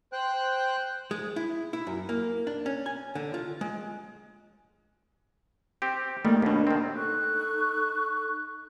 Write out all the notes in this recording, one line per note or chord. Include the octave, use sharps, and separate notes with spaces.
C5 G5 F#6
G#3
E4
E4
F#2
A#3
D4
C#4
G#5
D3
F4
G#3
C4 G4
D#3 G3 A3 A#3
D#2 B2 B3 D4
D#3 C4
D#4 A4 C#6 F#6